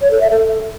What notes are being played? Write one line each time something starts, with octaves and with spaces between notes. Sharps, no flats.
C#5
A4
E5
A4